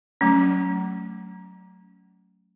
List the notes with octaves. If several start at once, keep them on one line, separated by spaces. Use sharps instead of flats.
F#3 A3 C#4